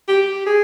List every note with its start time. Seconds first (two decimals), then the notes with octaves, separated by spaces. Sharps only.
0.08 G4
0.46 G#4